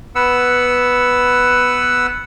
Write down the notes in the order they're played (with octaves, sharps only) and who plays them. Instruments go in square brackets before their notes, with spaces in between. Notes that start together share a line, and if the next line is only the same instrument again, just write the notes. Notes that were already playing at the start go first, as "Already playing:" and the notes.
[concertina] B3 B4 F#5 E6